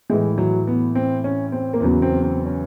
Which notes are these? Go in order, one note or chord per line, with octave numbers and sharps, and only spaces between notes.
A2 E3 G#3
F#3
B3
C4
C#4
C4
A#3
E2 C#3 F#3 B3
C4
C4
C#4